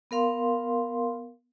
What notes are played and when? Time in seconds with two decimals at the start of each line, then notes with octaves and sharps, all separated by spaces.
0.11 B3 A#4 F5 C6